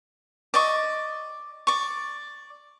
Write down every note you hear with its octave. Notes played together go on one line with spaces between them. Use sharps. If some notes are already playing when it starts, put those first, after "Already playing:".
D5 D#5 C#6
D5 C#6